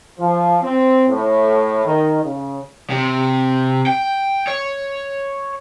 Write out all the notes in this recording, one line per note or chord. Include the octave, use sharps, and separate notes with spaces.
F3
C4
A2
D#3
C#3
C3
G5
C#5